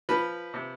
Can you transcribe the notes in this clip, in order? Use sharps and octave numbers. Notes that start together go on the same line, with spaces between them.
F3 B4
C3